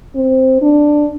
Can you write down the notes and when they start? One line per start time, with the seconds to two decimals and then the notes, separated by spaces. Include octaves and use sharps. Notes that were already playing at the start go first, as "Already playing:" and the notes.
0.15 C4
0.62 D4